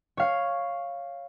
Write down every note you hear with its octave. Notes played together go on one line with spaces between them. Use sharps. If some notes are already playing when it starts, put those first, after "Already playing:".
C#5 F5